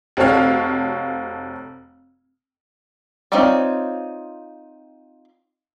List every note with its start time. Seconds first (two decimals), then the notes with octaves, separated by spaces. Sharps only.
0.17 F1 C4 F#4 A4 C#5 F5
3.32 C4 D#4 F4 C#5 D5